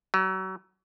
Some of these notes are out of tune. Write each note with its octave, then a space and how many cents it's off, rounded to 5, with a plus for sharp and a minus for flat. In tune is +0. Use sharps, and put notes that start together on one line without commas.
F#3 +35